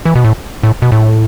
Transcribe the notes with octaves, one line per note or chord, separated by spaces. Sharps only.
E3
B2
A2
A2
B2
A2